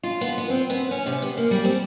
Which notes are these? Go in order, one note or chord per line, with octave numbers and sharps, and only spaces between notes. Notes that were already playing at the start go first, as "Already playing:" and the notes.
F4
B3
B3
C4
B3
C#4
C3
B3
A#3
G3
C4